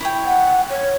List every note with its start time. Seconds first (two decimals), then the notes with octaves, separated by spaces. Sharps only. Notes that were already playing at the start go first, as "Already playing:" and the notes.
0.01 E4 C#5 G5
0.26 F#5
0.70 C#5